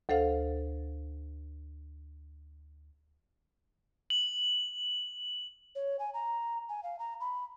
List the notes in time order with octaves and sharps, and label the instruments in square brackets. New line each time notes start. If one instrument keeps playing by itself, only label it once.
[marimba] D2 A4 C5 F5 F#5
[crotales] F#7
[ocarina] C#5
G#5
A#5
G#5
F5
A#5
B5